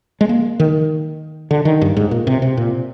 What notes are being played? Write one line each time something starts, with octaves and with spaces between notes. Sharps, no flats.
G#3
A#3
D#3
D3
D#3
G2
G#2
A#2
C3
C3
A#2